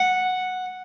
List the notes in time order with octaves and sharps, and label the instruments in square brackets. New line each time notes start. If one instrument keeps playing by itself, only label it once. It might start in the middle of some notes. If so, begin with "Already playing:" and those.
Already playing: [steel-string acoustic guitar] F#5